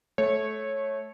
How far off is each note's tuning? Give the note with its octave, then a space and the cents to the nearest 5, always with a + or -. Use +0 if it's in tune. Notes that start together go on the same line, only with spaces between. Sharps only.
A3 -20 C#5 -15